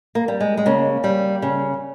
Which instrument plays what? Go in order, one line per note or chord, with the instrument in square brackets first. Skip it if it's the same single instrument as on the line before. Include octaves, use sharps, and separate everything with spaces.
[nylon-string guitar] A#3
G3
G#3
G#3
C#3 A#3
G3
C#3